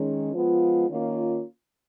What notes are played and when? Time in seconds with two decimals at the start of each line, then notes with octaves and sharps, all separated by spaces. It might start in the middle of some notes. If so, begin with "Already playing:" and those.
Already playing: D#3 G#3 C#4
0.34 F3 G#3 B3 F4
0.89 D#3 A#3 C#4 F4